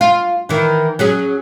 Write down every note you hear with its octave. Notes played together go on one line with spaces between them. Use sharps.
F4
D#3 E3
F#3 C#4 G#4